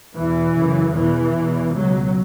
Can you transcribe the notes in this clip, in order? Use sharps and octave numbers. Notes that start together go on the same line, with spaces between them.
E2 B2 E3
F#2 C#3
E2 B2 E3
E2 B2
C#2 B2 F#3